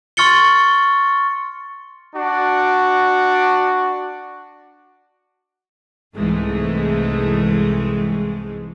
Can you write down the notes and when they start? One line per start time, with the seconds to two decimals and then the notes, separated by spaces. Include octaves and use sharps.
0.17 C6 C#6 F6 A6 C#7 G7
2.16 D4 F#4
6.15 C2 G#2 E3 G#3 A3